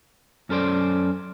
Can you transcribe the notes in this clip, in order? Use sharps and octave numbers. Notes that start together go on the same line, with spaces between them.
F#2 C#4 A4 C5 D5